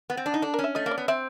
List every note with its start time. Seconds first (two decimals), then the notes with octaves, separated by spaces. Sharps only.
0.10 B3
0.17 C4
0.26 D4
0.34 D#4
0.42 D4 A4
0.54 C#4 A#4
0.64 E5
0.75 A3 D#5
0.86 A#3
0.91 D5
0.98 B3
1.08 C4 E5